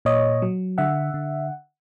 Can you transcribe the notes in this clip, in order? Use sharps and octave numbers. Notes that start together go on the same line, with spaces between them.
A#2 C#5 D#5
F#3
D3 E5 F#5
D3